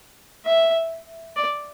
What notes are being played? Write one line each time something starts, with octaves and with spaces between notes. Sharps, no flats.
E5
D5